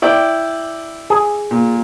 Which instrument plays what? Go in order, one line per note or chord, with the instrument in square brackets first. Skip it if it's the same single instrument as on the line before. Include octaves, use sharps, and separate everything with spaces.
[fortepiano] E4 D5 G5
[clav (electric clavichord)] G#4
[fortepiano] A#2